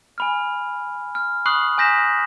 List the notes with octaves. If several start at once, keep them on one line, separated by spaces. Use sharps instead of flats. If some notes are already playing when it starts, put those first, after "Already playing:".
G#5 B5 F6
F6
B5 C#6 D#6 F#6 C7 F#7
G#5 D#6 G6 A#6 B6 E7